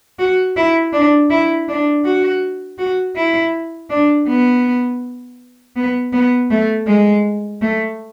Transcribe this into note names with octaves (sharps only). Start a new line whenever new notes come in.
F#4
E4
D4
E4
D4
F#4
F#4
E4
D4
B3
B3
B3
A3
G#3
A3